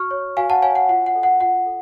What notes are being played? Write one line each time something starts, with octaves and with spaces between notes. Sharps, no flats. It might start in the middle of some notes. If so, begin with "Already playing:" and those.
Already playing: F#4 C#6 F6
C#5
F#4 F5 G#5
F#5 A5
C#5 F5 G#5
F#5
F4 F#5
F#5
A4 D5
F#5
F4 F#5
A4